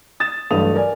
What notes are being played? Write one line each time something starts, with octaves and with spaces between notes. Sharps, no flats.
D#6 A6 E7
B1 G2 E3 A3 D#6 F7
A4 A#4 D5 G#5